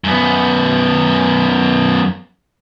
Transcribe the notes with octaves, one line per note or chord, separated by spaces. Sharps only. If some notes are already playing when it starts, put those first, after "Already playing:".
F#2 B3